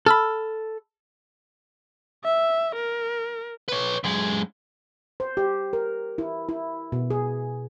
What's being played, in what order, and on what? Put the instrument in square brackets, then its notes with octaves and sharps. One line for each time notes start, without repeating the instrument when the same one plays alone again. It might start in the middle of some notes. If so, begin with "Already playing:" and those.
[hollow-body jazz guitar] A4 [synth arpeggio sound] B5 E6 F6
[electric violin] E5
A#4
[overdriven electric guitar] B4 C#5
F#2 G#3
[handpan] C5
G4
A#4
E4
E4
B2
G#4